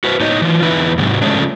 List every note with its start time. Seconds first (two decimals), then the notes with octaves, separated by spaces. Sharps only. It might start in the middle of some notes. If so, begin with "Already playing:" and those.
0.04 F#4 B4 C5
0.20 A2 D#4 C#5 D#5
0.42 E3 F4
0.62 E2 D#4 E4 B4
0.98 G#2 C3 F#3
1.22 C#3 F3 G#3 A3 C#4 D4